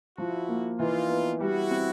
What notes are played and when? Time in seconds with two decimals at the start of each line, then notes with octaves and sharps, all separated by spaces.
0.18 F3 E4 F#4
0.49 A#3
0.79 E3 D#4 F4
1.10 B3
1.40 G3 E4 F#4
1.71 C4